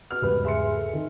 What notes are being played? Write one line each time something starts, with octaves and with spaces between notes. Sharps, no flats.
B2 F6
E2 G#2 C#3 G3 B4
G#4 E5 C6 C#7
A3
D#3